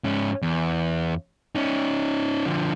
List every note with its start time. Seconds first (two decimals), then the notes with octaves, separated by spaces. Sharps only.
0.04 G#2 C#4
0.42 E2
1.55 C#4 D#4
2.46 D3 F3